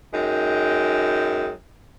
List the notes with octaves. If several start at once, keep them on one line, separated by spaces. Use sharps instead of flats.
F#2 G#3 D#4 G5